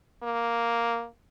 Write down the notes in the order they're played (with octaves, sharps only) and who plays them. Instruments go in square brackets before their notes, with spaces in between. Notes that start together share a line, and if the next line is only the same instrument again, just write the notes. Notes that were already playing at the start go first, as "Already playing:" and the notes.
[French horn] A#3